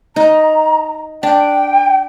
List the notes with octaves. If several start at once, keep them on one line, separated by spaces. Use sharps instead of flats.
D#4 A#5
D4 G5